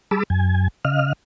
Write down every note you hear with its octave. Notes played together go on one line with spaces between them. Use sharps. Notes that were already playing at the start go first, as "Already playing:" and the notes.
G3 G#4 A5 B5 D6 E6
F#2 G#5
C#3 D#5 F5 F6